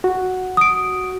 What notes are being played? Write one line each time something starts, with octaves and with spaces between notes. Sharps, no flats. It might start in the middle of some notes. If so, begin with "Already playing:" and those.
F#4
D#6 D7